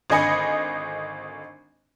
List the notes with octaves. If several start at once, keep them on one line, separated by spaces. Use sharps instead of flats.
G#1 D3 D#5 G#5 B5 C#7